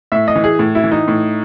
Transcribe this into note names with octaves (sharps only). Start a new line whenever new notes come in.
A2 E5
D#5
E3
G#4
A2
E4
E3
D#4
A2